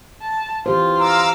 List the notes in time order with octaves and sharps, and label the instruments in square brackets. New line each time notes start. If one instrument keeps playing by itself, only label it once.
[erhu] A5
[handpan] E3 G4 C5 [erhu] F4
[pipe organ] F5 D6 E6 [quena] A#5